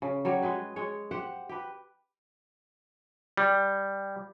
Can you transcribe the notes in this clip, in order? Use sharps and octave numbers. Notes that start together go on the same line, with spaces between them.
C#3
F#3 G3 C#5
G#3 G#4 B4
G#3 C#5
G4 C5 F#5
G4 B4
G3